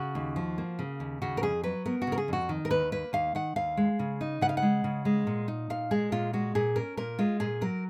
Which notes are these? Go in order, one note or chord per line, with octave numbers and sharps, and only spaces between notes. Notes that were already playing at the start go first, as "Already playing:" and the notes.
Already playing: C#3 F#4
D#2
F3
A#3
C#3
D#2
C#3 F#4
A#4
F2 G#4
F#3 B4
B3 A#4
F#4
C#3
A#4
G#4
F2 F#4
D#3
A#4
D#2 B4
A#3 B4
D#2 F5
D#3 F#5
D#2 F5
G#3
C#3
D#4
C#3 F#5
F5
F#5
G#3
C#3
G#3
A#2
D#4
A#2 F5
G#3 G#4
A#2 F4
G#3 F#4
A#2 G#4
C#4 A#4
A#2 A#4
G#3 F4
A#2 G#4
F#3 A#4